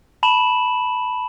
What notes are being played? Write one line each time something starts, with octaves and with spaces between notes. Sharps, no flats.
A5 B5 E7 F#7